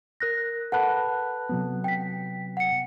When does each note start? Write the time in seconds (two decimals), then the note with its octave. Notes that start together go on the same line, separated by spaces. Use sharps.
0.20 A#4 F#6 A#6
0.72 A4 B4 F#5 A5 B5 F#6
1.49 C3 F#3 B3
1.84 G5 B6
2.57 F#5 C#7